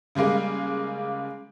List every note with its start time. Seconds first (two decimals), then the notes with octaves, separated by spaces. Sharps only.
0.15 C#3 G3 G#3 A#3 G#4